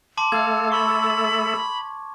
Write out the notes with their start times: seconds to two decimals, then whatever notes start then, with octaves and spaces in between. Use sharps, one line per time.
0.18 A5 C6 D6
0.32 A3 A4 F5 G#6
0.72 B5 C#6